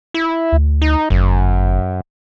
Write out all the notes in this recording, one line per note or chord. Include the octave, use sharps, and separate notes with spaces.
E4
D2
D#4
G1 F#2